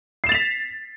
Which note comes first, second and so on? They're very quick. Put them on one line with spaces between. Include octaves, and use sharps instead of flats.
C7 E7 A6 F7 B6